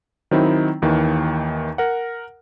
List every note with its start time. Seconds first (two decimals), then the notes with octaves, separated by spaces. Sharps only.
0.31 D#3 F#3 C4 D#4 E4
0.82 D#2 D#3 E3
1.78 A#4 F#5